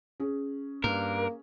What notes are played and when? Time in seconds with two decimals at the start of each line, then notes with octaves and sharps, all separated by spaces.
0.20 C#4 G#4
0.84 G2 A#3 A#4